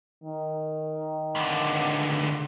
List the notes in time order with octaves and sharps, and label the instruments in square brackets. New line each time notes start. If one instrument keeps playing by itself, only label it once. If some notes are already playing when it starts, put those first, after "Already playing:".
[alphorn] D#3
[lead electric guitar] C#2 D3